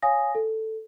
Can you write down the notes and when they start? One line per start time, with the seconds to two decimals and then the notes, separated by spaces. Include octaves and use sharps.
0.02 C#5 F5 G#5 D#6 A#6
0.35 A4